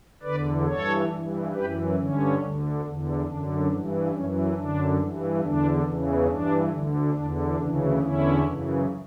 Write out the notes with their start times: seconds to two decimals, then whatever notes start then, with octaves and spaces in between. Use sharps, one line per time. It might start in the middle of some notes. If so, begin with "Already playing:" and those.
0.23 E2 D3 B4 D5
0.66 G2 E3 A4 C#5
1.09 G2 E3
1.52 F#2 E3 G4 B4
1.95 G2 D3 C#4
2.39 D2 D3
2.81 E2 D3
3.25 F#2 D3 D4
3.68 G2 E3
4.11 F#2 E3 C#4
4.54 F#2 D3 D4
4.98 G2 E3
5.40 E2 D3 D4
5.84 E2 C#3 E3
6.26 G2 E3 D4
6.70 D2 D3
7.13 E2 D3 D4
7.56 D2 C#3 E3 D4
7.99 E2 D3 C#4 E4
8.42 F#2 C#3 E3